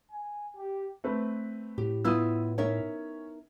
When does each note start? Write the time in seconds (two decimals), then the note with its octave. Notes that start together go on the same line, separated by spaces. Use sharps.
0.12 G#5
0.57 G4
1.04 A3 C4 B4
1.78 A2 G4
2.04 B3 E4 F4 D#6 E6
2.58 C#4 D#4 A#4 C#5 E5